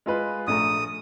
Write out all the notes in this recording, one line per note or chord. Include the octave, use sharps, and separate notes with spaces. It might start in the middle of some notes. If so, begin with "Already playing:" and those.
G#3 F4 B4
A#1 A3 A#5 D#6